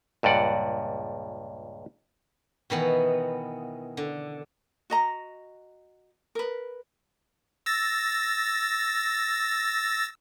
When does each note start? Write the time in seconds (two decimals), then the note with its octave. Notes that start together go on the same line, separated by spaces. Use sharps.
0.23 C#2 G2 A#2 D5 F#5
2.70 B2 D#3 E3 B3
3.97 D3
4.90 F#4 D#5 A#5
6.35 A#4 B4
7.66 E6 A6 A#6